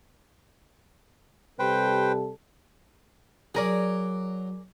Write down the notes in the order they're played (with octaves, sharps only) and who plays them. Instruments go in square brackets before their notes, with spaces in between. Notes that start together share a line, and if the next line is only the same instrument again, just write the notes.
[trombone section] C3 G3 A4 [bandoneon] B4 C5 G5
[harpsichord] F#3 [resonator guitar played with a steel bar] G#4 A#4 D5